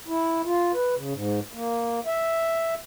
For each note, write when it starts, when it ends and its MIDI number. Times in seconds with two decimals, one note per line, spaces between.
0.08 0.42 64
0.45 0.72 65
0.74 0.95 71
0.95 1.13 49
1.14 1.40 44
1.53 2.00 58
2.06 2.74 76